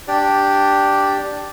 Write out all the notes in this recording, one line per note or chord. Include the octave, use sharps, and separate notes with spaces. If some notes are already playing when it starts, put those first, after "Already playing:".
D4 G4 D5